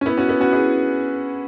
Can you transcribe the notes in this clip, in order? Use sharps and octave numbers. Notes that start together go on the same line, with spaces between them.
C#4
B3 E4
C#4 F#4
B3 E4
C#4 F#4
E4 G#4